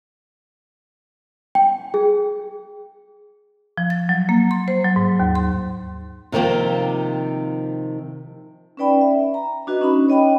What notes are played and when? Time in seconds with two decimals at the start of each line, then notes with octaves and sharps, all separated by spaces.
1.55 G5
1.94 G#4
3.78 F3
3.90 A6
4.09 F#3
4.29 A#3
4.51 C6
4.68 C5
4.85 F#3
4.96 G#2
5.20 D#2
5.35 C6
6.32 C3 D#3 F3 A#3 F4
8.77 C#4 D#4 B4 D5 G5 B5
9.01 E5
9.34 A#5
9.67 D4 F#4 B4 D#5
9.81 C#4 D#4 B5
10.08 C#5 D#5 G5 B5